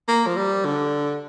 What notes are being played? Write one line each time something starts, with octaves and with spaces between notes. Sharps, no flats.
A#3
F3
G3
D3